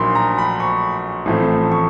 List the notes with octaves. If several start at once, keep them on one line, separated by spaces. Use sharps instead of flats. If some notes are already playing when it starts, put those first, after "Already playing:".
Already playing: A#1 A#2 F#3 A#3 D#4 B5 C6
A#5
B5
C#6
A1 A2 F3 A3 C4
C#6